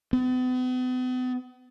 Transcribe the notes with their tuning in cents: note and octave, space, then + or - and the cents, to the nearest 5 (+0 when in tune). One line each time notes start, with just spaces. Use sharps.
B3 +40